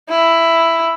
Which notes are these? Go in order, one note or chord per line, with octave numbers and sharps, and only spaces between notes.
E4